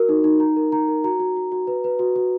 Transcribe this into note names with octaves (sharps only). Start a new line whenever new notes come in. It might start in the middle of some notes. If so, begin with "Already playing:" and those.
Already playing: F#4 A#4
D#4
D#4
D#4 A#5
A#4
D#4 A#5
A#4
F#4 A#5
F#4
F#4
F#4
B4
B4
F#4
F#4